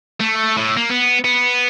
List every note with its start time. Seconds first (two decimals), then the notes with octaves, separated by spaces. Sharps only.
0.20 A3
0.57 A2
0.77 A#3
0.90 B3
1.25 B3